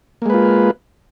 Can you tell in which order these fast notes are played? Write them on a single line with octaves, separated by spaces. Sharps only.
A#3 G#3 B4 F4